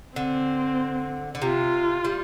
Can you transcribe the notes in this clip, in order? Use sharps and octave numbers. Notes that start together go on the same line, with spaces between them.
D3 C4
D3
C3 F4
G3